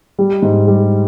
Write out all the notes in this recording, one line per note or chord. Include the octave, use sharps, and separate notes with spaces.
G3
G#2
G3